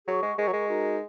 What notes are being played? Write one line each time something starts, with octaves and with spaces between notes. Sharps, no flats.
F#3 G#4 F#5 C#6
G#3
G#3 A#4 D#5 F#5 C#6
F#3
G#3
D#4 F#4 A#4